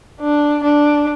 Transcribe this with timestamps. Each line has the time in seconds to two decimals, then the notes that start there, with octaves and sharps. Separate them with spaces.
0.20 D4
0.63 D4